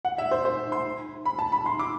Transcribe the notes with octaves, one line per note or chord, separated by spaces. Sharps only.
F#5
E5
C5
C5
C6
B5
A5
B5
C6
D6